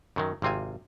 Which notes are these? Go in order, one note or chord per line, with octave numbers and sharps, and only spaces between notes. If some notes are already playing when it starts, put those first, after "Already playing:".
F#2 D#3 F#3
G#1 C3 C4 F4 G#5